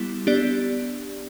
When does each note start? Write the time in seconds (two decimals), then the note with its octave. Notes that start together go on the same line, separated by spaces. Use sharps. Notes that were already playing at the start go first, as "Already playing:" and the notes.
Already playing: G3 B3 E4 G4
0.27 B3 D4 G4 D5